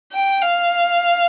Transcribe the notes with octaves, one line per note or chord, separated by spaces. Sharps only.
G5
F5